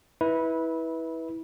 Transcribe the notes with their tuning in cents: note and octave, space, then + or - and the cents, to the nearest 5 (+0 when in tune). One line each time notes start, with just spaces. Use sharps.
E4 -25 B4 -10